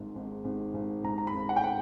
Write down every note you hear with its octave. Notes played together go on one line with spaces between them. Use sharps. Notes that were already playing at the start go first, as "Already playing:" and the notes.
Already playing: G#1 G#2
G#1
G#1
G#1
G#1 A#5
A#5
B5
G#1
F#5
G5
F#5